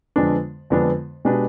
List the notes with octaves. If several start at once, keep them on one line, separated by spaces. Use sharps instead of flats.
F2 D3 G#3 B3 D4
F2 D3 G#3 B3 D4
B2 G#3 D4 G4 B4